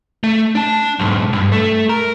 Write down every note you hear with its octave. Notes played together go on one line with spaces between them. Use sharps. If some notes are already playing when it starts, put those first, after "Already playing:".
A3
D4 A5
B1 G#2
G2
A3
A#4